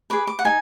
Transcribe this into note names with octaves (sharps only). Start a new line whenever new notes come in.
G#4 B4 D6
D6
F#5
D#4 G#5